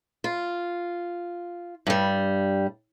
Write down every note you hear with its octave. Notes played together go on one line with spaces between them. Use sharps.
F4
G2 G3